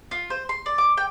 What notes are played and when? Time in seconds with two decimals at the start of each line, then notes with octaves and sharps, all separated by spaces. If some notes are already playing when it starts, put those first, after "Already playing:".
0.11 F4
0.30 C5
0.49 C6
0.66 D5
0.78 D6
0.97 G5